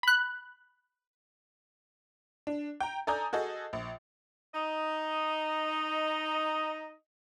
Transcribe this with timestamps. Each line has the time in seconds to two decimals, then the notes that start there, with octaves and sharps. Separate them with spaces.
0.03 B5 F#6
2.47 D4
2.80 G5 A#5
3.07 A4 D5 G#5 A#5 D#6 G6
3.33 F#4 G#4 A4 D#5
3.73 A#1
4.54 D#4 D#5